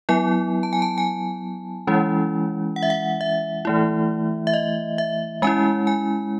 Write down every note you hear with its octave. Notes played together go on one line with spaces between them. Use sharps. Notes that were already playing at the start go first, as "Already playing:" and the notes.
F#3 B3 E4 G#5
A5
G#5
A5
G#5
E3 G#3 C#4 E4
F#5
E5
F#5
E5
E3 A3 E4
E5
D#5
E5
G#3 C#4 E4 G#5
G#5